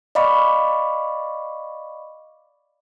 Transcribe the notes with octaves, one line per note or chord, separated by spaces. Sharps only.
D5 D#5 F5 B5 C#6 D6